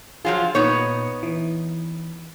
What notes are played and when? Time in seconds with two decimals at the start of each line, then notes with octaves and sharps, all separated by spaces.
0.25 F3 F#3 F4 G#4
0.55 A#2 B3 D#4 C#5
1.23 E3